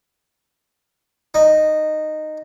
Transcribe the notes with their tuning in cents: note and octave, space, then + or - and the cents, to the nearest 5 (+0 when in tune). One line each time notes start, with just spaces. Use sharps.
D#4 -10